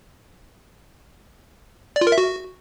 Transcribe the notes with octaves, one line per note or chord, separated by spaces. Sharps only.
D5
F4
A#4
E5
F#4